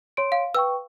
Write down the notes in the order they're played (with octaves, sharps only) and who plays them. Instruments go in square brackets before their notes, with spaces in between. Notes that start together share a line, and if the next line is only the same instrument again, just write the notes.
[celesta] C#5 C6 D7
[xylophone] F5
[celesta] B4 G5 C#6 [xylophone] E6